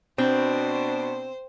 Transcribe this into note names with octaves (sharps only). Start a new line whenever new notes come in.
B2 C4 D4 C5